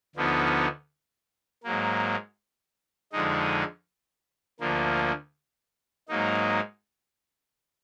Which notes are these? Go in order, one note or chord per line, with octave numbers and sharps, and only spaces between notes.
D2 D3 F3 B3 D#4
G#2 F#3 A#3
F2 D3 G#3 D#4
D2 D3 F3 A#3
G#2 F#3 A#3 D#4